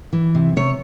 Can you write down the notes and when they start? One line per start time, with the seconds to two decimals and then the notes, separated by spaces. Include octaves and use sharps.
0.13 E3
0.35 C3
0.56 C3 C#5